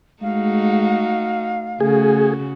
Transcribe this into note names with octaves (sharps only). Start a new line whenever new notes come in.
G#3 A3 D#4 F#4 F5
C#3 A3 F#4 G#4